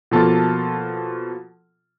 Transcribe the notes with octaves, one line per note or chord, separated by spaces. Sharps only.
B2 F3 A#3 F4 A4 A5